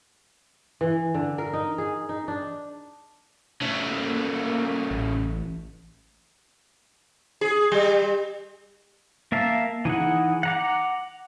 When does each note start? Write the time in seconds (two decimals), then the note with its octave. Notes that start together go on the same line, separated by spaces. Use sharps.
0.81 E3
1.14 D3
1.38 A#4
1.53 D#4
1.78 G#4
2.09 D#4
2.28 D4
3.62 C#3 A3
3.90 A#3
4.90 A1
7.41 G#4
7.72 G3
9.32 A#3 A#4 E5 F5 A5
9.85 E3 D#4 G#4 F#5
10.43 F#5 A#5 D6